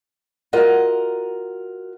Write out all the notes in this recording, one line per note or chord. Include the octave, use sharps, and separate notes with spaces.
F4 F#4 A#4 D#5